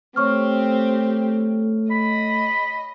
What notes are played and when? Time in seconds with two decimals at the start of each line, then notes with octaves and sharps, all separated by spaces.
0.16 A3 C4 G4 C#5 C#6 F6
1.91 D#5 B5